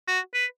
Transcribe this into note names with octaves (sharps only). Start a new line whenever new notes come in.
F#4
B4